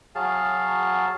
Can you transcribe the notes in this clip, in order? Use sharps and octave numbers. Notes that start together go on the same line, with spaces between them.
F#3 G#4 F5 A5